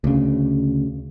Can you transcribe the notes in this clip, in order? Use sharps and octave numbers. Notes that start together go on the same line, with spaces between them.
D2 C#3